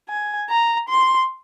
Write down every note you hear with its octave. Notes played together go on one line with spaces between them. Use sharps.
G#5
A#5
C6